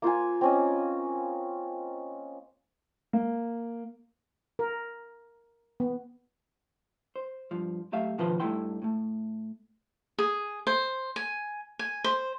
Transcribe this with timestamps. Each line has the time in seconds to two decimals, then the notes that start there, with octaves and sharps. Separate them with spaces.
0.02 A#3 F4 C5 G#5
0.41 C4 C#4 D#5
3.13 A#3
4.59 A#4
5.80 B3
7.16 C5
7.51 G2 F3
7.92 F#3 A3 G4 E5 F5
8.18 B2 D#3 F3 F4 B4 C5
8.40 G2 A3 D#4 E4 G5 C6
8.82 A2 A3
10.19 G#4
10.67 C5
11.16 G#5
11.79 G#5
12.04 C5